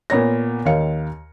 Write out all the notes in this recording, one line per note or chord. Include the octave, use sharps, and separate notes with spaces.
A#2 B3 C#5 A#6
D#2 D#3 C#5 F5 C#7